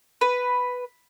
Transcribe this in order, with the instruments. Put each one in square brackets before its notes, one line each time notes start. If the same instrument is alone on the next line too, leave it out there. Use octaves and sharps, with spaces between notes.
[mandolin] B4